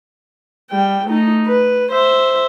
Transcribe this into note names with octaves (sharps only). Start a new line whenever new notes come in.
G3 G5
A3 D#4
B4
C5 E5